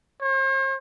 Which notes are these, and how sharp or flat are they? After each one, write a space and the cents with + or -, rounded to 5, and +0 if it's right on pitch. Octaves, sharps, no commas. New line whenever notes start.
C5 +45